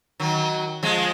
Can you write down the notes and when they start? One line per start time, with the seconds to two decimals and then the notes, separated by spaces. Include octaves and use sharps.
0.20 D#3 F#3
0.83 F3 G#3